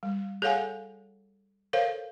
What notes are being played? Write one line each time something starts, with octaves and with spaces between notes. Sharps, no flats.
G3
G#4 A4 C#5 F5 F#5 G#5
A4 A#4 C5 C#5 F5